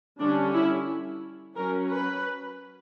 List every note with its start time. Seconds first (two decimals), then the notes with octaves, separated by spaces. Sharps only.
0.19 D3 G3 C#4 D4
0.53 E4
1.56 F#3 C#4 A#4
1.91 B4